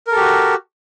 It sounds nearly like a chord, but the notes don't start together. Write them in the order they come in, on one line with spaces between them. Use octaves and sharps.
A#4 A4 G4 F#4